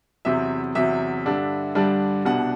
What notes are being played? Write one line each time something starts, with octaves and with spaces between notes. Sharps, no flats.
E2 C3 F#3 E5
E2 C3 F#3 E5
G2 D3 G3 D4
G2 D3 G3 D4
C2 B2 G3 D4 F#5